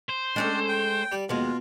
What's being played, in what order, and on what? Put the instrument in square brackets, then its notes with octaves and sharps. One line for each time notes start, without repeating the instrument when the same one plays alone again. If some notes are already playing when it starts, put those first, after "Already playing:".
[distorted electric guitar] C5
[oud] G#3 C#4 A4 [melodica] D4 D5 G5
[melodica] G5
[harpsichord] G3 D5
[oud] D#2 G#3 [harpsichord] B2 [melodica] F4